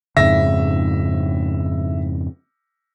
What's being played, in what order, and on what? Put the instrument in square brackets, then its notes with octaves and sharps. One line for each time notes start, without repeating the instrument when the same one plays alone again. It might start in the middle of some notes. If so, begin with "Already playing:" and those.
[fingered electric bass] F2 G#2 C#3 [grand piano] E5 A#6